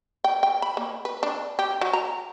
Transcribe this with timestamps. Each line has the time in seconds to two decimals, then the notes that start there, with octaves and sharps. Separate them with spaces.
0.24 G5
0.43 G5
0.62 B5
0.77 A#3
1.05 B4
1.23 D4
1.59 G4
1.81 F#3
1.93 A#5